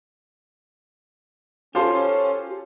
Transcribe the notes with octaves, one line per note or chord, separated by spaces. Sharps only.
C#4 F4 G4 A4 C5 A5